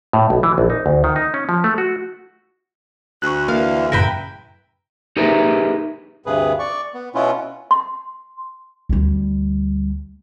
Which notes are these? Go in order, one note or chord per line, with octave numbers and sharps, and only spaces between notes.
A2
B1
E3
A#1
D#4
D2
D#3
D#4
C#4
F3
A3
F#4
D2 C#6 F#6
D3 E3 A#3 F5
F#2 A2 C#3 E4 A#4 B4 G5 B5
D#4 G4 G#4 A#4 B4 E5
D2 G2 C3 G#4 B4
D5 C#6
B3
B2 B3 C#4 E4 F4
C6
D2 G3